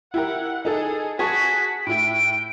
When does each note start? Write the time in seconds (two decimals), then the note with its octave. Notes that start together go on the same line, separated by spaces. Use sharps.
0.14 E4 G4 A#4 F#5
0.65 D#4 G#4 A4
1.19 F#4 G#4 A5 C#6 B6
1.87 A2 E4 G5 D7